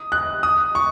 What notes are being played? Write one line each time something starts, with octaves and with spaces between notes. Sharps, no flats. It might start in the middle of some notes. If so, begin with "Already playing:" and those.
Already playing: D#6
F#6
D#6
C#6